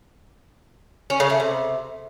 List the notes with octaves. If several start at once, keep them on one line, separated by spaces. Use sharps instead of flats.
C#4
C#3
A3
C3